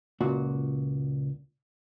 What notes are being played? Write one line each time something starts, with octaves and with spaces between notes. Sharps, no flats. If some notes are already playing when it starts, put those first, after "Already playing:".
C#2 A#2 F#4